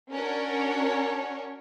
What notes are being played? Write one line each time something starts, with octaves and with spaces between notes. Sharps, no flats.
C#4 D4 F#4 A#4 C#5